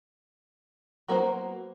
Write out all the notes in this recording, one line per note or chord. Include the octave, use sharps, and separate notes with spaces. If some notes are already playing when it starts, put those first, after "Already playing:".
F#3 A#3 B3 G#4 C5